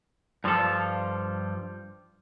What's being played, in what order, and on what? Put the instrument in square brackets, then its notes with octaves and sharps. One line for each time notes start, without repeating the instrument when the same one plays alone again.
[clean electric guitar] G2 F3 G3 F4 A4